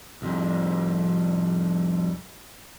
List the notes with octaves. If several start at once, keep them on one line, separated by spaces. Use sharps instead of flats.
C2 F2